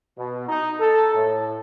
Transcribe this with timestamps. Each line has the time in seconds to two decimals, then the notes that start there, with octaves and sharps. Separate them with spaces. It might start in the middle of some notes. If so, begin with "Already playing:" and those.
0.17 B2
0.48 D#4
0.80 A4
1.15 A2